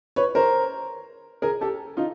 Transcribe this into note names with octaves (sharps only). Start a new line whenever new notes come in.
B4 C#5
A#4 C5
G#4 A#4
G4 A4
D#4 F4